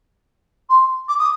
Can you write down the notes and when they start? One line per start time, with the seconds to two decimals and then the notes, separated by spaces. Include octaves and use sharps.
0.69 C6
1.08 D6
1.19 D#6